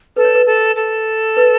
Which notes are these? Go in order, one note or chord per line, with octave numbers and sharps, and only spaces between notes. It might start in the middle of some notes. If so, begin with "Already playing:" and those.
A4 B4
C#5
B4
A4
A4
B4